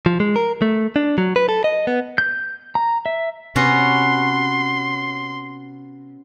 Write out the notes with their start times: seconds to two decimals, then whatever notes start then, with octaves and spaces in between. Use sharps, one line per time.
0.06 F3
0.20 G#3
0.36 A#4
0.62 A3
0.96 D4
1.18 F#3
1.36 B4
1.49 A4
1.64 D#5
1.87 B3
2.18 G6
2.75 A#5
3.06 E5
3.56 C3 B3 C#4 F#4 C6